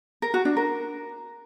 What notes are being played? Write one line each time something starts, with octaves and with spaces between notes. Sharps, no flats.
A#4
F#4
D4
A#4